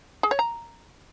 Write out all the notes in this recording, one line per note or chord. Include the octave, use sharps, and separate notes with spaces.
G#4
C#5
A#5